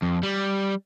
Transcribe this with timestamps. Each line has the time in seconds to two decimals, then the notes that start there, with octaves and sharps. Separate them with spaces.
0.02 F2
0.23 G3